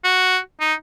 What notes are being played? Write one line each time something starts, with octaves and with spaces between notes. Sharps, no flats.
F#4
D#4